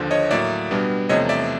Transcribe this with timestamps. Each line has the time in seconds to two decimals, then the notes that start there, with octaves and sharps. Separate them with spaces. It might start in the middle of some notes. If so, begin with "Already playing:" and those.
Already playing: D#2 D3 F3
0.11 C#5 D#5
0.31 A2 F#3 A#3 D5 E5
0.71 B2 G3 B3 D4
1.09 E2 C3 F3 A3 C#5 D#5
1.29 D5 E5